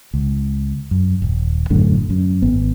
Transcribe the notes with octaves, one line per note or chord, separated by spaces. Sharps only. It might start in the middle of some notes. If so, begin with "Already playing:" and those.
C#2
F#2
D#1
G#1 F#2 A2 D3
F#2
G#1 B3